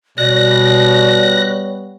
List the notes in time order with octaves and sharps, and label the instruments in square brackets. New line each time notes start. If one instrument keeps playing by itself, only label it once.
[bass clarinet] B2 [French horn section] G3 B3 C#5 [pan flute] D5 [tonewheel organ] F#6 A#6